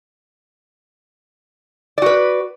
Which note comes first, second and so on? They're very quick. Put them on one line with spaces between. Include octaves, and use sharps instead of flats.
D5 F#4 B4